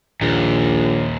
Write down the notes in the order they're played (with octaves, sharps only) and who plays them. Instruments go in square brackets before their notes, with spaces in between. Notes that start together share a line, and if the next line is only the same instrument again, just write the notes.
[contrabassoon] A#1 [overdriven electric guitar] D#2 A#2